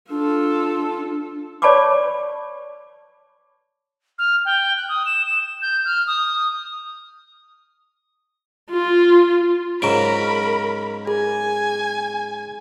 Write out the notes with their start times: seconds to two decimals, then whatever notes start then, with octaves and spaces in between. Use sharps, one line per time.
0.10 D4 F4 A4
1.62 C#5 D5 A5 B5 C#6 D6
4.19 F6
4.45 G5
4.77 F#6
4.89 D#6
5.06 E7
5.26 E7
5.62 G6
5.85 F6
6.07 D#6
8.71 F4
9.82 G#2 C#3 F#3 A#4 A#5 B5 D7
11.07 G#4 G#5